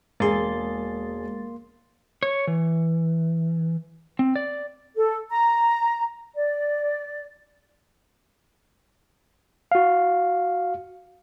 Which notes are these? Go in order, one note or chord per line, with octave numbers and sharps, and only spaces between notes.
E1 G#3 A#3 G#4 C6 A6
C#5
E3
C4
D5
A4
A#5
D5
F#4 F5